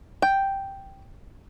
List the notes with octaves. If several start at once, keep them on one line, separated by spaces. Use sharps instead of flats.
G5